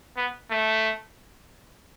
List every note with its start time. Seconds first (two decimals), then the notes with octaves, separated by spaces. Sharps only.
0.16 B3
0.50 A3